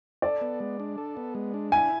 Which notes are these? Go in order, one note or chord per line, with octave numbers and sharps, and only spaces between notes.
A4 D5
B3
G#3
D4
A4
B3
G#3
D4
E4 G#5